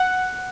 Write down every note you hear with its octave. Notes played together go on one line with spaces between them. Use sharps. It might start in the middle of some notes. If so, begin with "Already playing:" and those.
Already playing: F#5